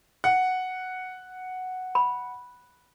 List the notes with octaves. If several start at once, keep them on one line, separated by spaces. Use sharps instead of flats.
F#5
B5